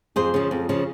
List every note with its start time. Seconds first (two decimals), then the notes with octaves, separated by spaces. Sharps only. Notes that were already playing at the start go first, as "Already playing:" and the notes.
0.16 F2 G#4 C5
0.34 C#3 F3
0.51 F2
0.69 C#3 F3